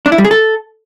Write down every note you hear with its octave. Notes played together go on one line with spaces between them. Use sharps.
D4
E4
G3
G#4
A4